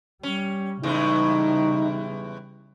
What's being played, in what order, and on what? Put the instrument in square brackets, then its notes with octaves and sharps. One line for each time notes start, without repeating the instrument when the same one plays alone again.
[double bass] G3 [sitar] C#4
[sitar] E2 A2 G#3 [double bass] C#3 G3 [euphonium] D#4